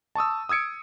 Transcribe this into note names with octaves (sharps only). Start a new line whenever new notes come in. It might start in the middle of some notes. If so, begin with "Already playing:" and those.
A5 C#6 D#6 E6
D#6 E6 G#6 C#7 D7